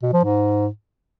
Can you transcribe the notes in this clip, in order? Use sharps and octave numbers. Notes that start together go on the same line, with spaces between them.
B2
F3
G#2